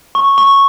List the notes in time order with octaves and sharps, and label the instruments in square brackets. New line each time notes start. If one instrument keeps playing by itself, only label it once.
[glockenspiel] C#6
C#6